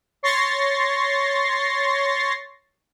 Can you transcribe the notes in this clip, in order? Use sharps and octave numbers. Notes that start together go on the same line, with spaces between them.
C#5 C6 C#6 A6 A#6 C7